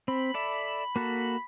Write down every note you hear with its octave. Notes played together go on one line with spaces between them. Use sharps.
C4 B5
A4 D5 E5
A#3 F#4 A4